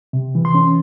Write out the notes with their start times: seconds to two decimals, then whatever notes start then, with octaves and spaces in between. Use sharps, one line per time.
0.13 C3
0.35 E3
0.45 C6
0.55 C#4